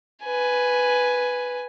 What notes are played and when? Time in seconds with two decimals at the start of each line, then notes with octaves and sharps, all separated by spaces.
0.24 B4 G#5